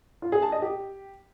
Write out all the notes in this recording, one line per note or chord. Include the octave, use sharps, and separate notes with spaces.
F4
G#4
A5
D#5
G4